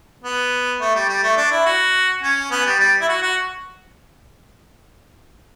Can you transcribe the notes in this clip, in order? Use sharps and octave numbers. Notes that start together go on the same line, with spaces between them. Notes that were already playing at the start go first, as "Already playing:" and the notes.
B3
A3
G3
G3
A3
D4
E4
F#4
C#4
B3
G3
G3
E4
F#4
F#4